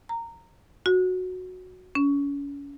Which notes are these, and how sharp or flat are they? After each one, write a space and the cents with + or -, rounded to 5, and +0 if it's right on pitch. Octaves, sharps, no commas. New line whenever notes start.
A#5 -15
F#4 -10
C#4 +35